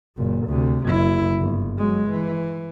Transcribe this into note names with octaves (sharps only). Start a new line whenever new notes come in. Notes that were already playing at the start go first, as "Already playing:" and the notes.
F#1 A#2
D2 C3
F#1 E4
G1
F#3 G#3
E3